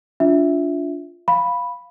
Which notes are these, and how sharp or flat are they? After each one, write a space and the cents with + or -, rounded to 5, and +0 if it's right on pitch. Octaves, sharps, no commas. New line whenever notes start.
D4 -25 F4 +0 E5 +0
F5 +0 B5 +0